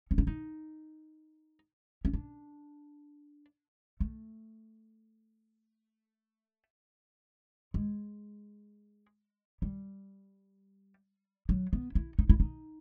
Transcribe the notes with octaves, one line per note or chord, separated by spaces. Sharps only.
C#4
D4
D#4
C#4
D4
A3
G#3
G3
F#3
B3
E4
D#4
E4
D#4